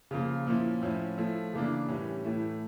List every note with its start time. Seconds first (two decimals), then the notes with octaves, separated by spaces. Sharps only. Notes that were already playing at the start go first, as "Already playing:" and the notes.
0.11 C#3 F3 A#3
0.47 A#2 F3 C#4 E4
0.82 A2 F3 C#4 E4
1.17 F3 A3 E4
1.53 C#3 E3 A#3 D4
1.88 A2 E3 G3 C#4
2.24 A2 E3 A3 E4